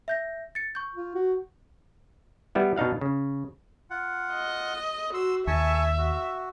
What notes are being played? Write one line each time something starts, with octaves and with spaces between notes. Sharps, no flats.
E5 G6 A#6
A6 C#7
C#6 G6
F4
F#4
G3 B3 E4
B2 D4 D#4 F5 F#5
C#3
F4 F#5
D#5
F#4 C6 E6
D#2 E5 G#5 A5 C#6
F#4